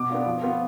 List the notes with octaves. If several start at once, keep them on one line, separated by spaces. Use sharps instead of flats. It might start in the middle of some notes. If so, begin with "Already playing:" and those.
Already playing: B2 D6
B3 D4 F4
F3
B3 F4